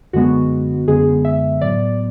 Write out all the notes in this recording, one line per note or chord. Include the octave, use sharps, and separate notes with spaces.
F#2 D3 G#3 B3 F#4
F#2 D3 G#3 B3 G#4
E5
A2 F#3 B3 D5